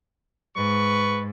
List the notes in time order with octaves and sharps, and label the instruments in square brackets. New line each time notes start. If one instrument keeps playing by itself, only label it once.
[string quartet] G#2 [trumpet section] B4 C#6